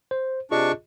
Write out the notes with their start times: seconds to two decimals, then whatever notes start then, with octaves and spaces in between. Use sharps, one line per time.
0.11 C5
0.51 C3 D4 F4 G#4 D#5 C#6